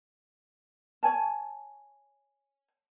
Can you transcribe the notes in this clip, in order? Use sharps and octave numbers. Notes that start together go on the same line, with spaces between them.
C#5 G#5 A5